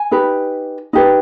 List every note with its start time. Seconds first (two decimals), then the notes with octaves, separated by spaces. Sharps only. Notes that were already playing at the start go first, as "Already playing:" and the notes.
Already playing: G#5
0.11 D#4 G4 B4
0.93 D#4 G4 B4